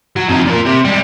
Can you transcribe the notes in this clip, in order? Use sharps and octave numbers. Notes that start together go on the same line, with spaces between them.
F#3
F2 D#4
A#2 A#4
C3
G3 G#3